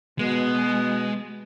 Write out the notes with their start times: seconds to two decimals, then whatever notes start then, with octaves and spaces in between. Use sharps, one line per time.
0.19 B2 G#3 B3